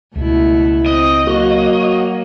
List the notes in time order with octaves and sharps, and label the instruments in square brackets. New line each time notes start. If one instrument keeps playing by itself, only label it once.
[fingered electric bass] C#2 [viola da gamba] B2 A3 E4
[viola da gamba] C4 [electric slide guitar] D#5 [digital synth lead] D#6
[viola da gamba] F#3 A#3 [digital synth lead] F#4